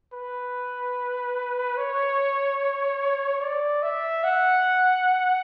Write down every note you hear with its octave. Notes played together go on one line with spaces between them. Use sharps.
B4
C#5
D5
E5
F#5